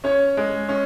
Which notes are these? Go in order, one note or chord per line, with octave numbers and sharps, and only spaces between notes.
C#4 C#5
G#3
C#4